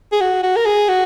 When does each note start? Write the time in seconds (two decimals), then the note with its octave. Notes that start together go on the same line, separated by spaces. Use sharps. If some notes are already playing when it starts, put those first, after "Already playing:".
0.12 G#4
0.21 F#4
0.43 F#4
0.56 A#4
0.66 G#4
0.88 F#4